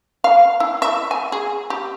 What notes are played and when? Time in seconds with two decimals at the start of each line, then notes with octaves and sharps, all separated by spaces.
0.24 F5
0.60 E4
0.82 E5
1.11 G#5
1.32 G#4
1.70 G4